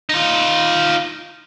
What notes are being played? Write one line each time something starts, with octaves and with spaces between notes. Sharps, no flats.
D#4 F4